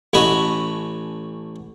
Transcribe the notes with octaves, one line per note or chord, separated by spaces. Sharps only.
A1 A3 C#4 F#4 D#5 B5